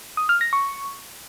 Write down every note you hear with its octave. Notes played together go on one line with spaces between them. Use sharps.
D#6
F6
A#6
C#6